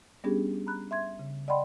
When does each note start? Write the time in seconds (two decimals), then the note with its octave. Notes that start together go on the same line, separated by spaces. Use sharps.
0.24 G3 B3 C#4 D4 G4 G#4
0.67 A#5 B5 F#6
0.91 E5 C6 G#6
1.19 C#3
1.48 D5 D#5 F#5 G5 B5 C6